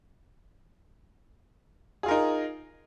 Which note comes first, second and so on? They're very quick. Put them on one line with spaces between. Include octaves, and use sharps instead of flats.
G#4 F4 A#4 D#4